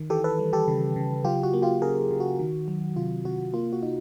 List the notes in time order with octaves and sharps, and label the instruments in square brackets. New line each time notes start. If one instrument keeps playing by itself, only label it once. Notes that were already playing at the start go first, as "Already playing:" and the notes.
Already playing: [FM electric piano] D#3
E3 G4 A4
A4 B4
G3
G4 A4
C#3
C#3
F#3 F4 G4
F#4
A#3
F4 G4
C#3 G#4 A#4
C#3
F#4
D#3
F#3
C3 F4
C3 F#4
A#3 F4
F#4
D#4